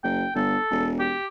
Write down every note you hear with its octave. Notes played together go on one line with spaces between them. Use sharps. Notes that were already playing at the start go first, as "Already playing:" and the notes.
F#1 G5
G1 A4
E1
G4